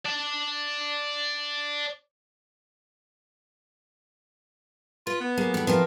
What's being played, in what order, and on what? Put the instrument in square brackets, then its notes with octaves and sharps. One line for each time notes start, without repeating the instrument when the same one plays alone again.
[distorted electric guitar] D5 A5
[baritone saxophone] F4 [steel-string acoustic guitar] B4
[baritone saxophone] B3
[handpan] F#3 G#4 [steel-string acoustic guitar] A#3
[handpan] E3 A4 B4 [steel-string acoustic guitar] G3 G4
[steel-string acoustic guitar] F3 F4 G4 [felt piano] C4 B4 [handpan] A#4